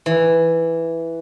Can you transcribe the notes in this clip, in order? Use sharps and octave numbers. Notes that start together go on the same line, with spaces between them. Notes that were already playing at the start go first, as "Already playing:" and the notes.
E3